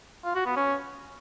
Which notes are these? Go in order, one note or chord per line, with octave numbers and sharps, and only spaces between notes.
F4
F#4
B3
C#4